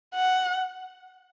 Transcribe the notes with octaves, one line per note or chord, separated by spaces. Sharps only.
F#5